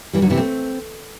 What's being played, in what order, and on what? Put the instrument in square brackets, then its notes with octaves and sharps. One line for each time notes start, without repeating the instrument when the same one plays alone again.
[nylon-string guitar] E3 G3
D3 F#3
C3 E3
A3 C4